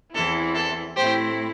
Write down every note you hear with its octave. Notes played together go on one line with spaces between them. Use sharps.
E2 E3 C4 E4 A4
A4
A2 A3 C4 E4 G4 C5